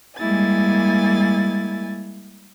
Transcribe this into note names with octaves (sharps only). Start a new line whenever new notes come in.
G3 G#3 A#3 E4 G#5 A6